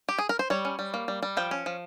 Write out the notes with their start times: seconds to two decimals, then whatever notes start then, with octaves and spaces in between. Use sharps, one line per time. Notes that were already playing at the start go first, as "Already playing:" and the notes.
0.09 G4
0.18 G#4
0.29 A#4
0.39 C5
0.50 G3 C#5
0.65 C#4
0.79 G3
0.94 A#3
1.08 G3
1.23 G3
1.37 F3 G5
1.51 C#4
1.66 F3